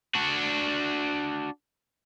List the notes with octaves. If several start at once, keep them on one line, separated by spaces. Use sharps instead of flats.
D4 F#4